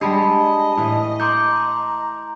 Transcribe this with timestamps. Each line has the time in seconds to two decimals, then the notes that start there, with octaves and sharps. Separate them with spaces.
0.01 G3 G#3 D4 G4 G#4 D#5 A5 B5
0.77 A2 E3
1.20 A4 A#5 C6 D6 G6